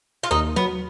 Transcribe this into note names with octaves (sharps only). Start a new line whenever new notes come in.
F4
D#2 D#4
F#3 B3